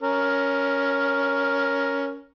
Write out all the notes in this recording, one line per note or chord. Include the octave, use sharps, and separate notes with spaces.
C#4 A#4